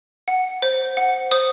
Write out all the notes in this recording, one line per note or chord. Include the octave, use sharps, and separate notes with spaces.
F#5
C5
F#5
C5 D#6